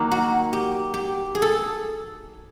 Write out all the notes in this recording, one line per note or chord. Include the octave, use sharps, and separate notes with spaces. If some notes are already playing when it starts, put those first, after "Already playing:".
Already playing: D#3 F#3 A#3
F#4
G4
G4
G#4
A4